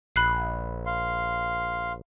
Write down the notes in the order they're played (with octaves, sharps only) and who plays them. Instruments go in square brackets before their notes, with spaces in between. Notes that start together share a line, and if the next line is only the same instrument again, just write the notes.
[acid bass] A#1 [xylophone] B5 F#6 C7
[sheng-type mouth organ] F5 C6